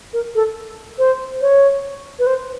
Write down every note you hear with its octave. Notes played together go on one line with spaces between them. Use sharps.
A#4
A4
C5
C#5
B4
C5